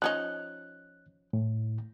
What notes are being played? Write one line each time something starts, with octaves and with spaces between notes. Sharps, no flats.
F3 C#4 D#4 F#6
A2